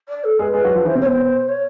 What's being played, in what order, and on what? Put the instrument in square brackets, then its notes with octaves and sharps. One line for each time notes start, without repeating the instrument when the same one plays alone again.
[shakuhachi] D5
A4
[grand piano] G#3 G#4 [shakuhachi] B4
[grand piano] G#3 G#4
F#3 F#4
F3 F4
[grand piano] E3 E4 [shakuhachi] C5
[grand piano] C3 C4
[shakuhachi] C#5
[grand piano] B2 B3 [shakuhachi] C5
[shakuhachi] C#5